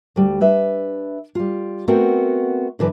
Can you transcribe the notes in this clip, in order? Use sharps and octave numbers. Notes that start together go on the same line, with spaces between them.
D2 G3
D4 B4 E5
G3 F4
A3 B3 C4 F#4 A4 A#4
F#2 D3 E3 B4